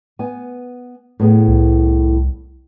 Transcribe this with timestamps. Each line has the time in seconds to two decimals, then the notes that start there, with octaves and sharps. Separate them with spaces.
0.19 B3 G#5
1.20 A2 B3 G#4
1.48 C2